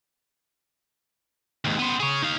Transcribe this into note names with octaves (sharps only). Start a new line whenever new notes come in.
D#2 G#2
B3 C5
G#4 C#5
D#4 F5